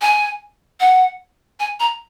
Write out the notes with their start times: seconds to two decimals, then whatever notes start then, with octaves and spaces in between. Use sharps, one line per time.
0.01 G#5
0.80 F#5
1.60 G#5
1.80 A#5